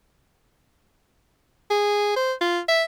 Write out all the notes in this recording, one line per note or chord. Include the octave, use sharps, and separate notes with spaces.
G#4
C5
F4
E5